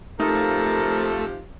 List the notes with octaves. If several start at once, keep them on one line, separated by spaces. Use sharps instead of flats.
C3 F3 A3 D#4 A4 A#4